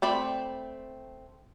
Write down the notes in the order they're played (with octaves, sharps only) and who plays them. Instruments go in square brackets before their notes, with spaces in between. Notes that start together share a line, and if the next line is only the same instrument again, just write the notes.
[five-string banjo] A3 C4 D5 B5